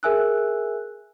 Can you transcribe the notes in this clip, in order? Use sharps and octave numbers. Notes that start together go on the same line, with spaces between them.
G#4 A#4 E5 G#5 E6 F#6